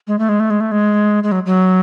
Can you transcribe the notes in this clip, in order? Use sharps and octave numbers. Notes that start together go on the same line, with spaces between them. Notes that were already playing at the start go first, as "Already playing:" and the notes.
G#3
A3
G#3
A3
G#3
A3
G#3
G#3
F#3
F#3